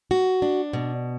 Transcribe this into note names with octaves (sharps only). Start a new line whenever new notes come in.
F#4
D4
B2